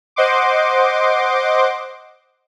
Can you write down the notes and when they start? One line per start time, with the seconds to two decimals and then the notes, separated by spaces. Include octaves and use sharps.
0.16 C5 D#5 F#5 C6 D6